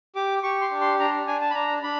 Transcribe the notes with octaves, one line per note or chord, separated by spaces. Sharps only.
G4 D6
G4 C#6
C6
D4
C6
D4 A#5
D4 G#5
A5
B5
D4 A#5
D4 B5